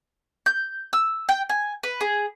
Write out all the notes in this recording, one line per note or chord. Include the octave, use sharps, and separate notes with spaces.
G6
E6
G5
G#5
B4
G#4